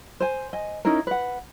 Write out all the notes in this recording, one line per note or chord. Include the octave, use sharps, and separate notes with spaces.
C5 G#5
D#5 G#5
C#4 D#4 E4 A#4
B4 F#5